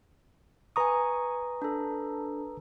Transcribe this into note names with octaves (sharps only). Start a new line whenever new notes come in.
B4 G#5 A#5 C#6 D#6
D4 A4